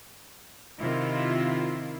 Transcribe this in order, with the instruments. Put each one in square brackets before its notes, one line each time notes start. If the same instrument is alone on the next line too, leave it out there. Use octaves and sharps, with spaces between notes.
[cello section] C3 D#3 E4 F4